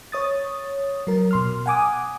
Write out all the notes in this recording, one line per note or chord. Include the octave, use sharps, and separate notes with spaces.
C#5 D#6 A6
F#3 A#4
B2 C6 F6
F#5 G#5 D6 D#6